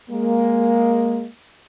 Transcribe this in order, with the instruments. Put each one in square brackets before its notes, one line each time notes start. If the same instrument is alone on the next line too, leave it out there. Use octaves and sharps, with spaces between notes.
[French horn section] G#3 A#3